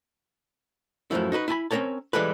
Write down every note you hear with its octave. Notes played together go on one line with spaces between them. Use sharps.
F#2 A2 E3 F3 E4
D#4 F#4 A4 B4
E4 G#5 A5 B5
C4 C#4 D#4 A#4 C#5 A5
E3 G3 G#3 E4 A4 B4